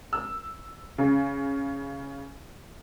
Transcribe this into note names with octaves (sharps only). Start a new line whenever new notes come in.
E6
C#3